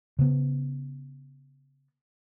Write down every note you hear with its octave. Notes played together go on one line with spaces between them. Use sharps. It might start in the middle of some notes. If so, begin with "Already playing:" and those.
C#3 B3